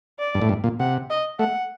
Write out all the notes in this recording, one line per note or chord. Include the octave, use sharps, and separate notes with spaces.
D5
G2
A2
G2
A#2
C3 F#5
D#5
A3 F#5